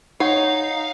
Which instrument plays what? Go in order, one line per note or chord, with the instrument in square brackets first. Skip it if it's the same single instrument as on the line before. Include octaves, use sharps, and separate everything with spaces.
[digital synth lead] D#4 [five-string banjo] C#5 [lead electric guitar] F5 [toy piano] F#5